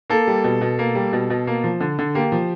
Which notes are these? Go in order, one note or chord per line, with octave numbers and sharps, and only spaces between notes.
A#3 A4
G3
B2
B2
A#3
G3
B2
B2
A#3
F3
D3
D3
A#3 G4
F3